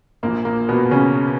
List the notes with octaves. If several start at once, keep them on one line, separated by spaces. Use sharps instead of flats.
A#1 A#2 F3 A#3
A#3
B2 B3
C#3 C#4